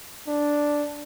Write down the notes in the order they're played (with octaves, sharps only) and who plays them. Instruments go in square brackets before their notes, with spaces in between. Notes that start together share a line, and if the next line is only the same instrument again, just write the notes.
[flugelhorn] D4